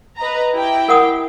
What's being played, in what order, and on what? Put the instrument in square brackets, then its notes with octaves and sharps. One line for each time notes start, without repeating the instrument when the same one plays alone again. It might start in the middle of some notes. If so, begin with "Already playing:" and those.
[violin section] B4 D#5 A#5
E4 G4 G5
[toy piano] A#4 F#5 D#6